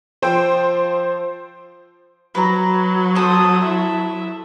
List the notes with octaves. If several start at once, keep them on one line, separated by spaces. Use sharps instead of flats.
F3 C5 G5 E6
F#3 B4 A#5
A4 C5 D#6
E4 E5